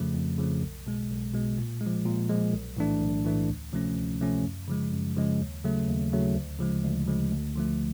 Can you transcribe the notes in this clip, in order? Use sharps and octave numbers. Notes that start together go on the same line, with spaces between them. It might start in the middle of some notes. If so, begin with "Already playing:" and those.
Already playing: F2 C#3 F3 A3
F2
C#3 F3 A3
B1
B2 G#3
B1
B2 G#3
A#2
G#3
F3
A#2
F3 G#3
B1
A2 E3 A3 D4
B1
A2 E3 A3 D4
D2
C3 F3 A3 C#4
D2
C3 F3 A3 C#4
F#2
C#3 F3 G#3
F#2
C#3 F3 G#3
D#2
C#3 F#3 A3
D#2
C#3 F#3 A3
D2
C#3 F3 G#3
D2
C#3 F3 G#3
D2
D3 F3 A3